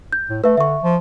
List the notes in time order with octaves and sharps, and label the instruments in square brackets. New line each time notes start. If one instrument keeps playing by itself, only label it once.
[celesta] G6
[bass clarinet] A2
[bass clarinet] A3 [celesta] B4 E5
[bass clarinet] D3 [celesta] E5 C#6
[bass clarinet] F3